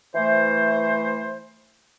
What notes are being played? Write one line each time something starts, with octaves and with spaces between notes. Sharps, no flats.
E3 A3 C5